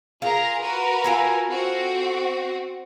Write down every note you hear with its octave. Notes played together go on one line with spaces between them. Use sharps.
F4 G#4 A#4 A#5
F#4 A#4 B4
F4 A4 G#5
C4 F#4